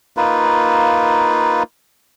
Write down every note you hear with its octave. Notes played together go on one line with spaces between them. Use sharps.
A#3 D#4 F4 B4